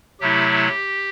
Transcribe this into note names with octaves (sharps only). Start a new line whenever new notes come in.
C3 F#3 A3 E4 G4